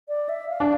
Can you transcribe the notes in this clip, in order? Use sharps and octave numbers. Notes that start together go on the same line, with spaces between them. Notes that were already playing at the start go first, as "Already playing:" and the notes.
D5
E5
F5
D4